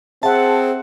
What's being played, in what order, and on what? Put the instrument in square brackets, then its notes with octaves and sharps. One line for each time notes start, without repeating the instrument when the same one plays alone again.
[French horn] C4 [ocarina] G#4 [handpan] E5 F#5 [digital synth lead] A5